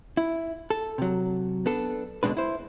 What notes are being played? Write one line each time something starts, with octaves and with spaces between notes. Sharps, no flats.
E4
A4
C3 F#3
B3 D4 A4
C#2 B2 F3 G#3 D4 B4
E4 C5